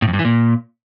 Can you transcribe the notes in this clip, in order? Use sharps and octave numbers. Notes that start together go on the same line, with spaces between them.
A2
F2
G2
E3
A#2